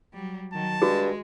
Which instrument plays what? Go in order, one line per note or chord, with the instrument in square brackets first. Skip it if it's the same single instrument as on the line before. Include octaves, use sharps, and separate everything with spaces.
[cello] F#3 G3
[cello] D#3 F#3 [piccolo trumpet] A5
[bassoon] G2 [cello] G#3 [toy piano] F#4 G#4